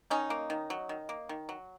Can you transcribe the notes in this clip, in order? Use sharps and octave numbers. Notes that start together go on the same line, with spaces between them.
D#3 C#4 D#4
A#3
D#3
F#3
D#3
A#3
D#3
F#3